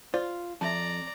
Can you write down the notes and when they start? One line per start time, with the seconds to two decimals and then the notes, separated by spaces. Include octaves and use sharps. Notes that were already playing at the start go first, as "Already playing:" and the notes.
0.14 F4 C5 D5
0.61 F2 D5 E5 A5 A#5